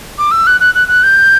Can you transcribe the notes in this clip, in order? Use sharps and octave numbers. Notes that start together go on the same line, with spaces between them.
D6
E6
F#6
F#6
F#6
F#6
G6